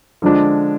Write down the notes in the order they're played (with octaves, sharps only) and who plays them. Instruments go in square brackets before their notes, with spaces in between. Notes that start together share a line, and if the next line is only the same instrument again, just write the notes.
[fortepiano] D3 F3 G#3 D4